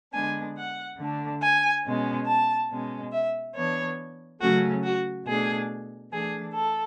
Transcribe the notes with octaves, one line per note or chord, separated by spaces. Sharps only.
D3 G#3 B3 D4 G#5
F#5
D3 A3 D4
G#5
B2 G#3 C#4
A5
B2 G#3 C#4
E5
E3 B3 D4 C#5
C#3 F#3 A3 C#4 F#4
F#4
B2 A3 D4 G#4
E3 A3 D4 G#4
A4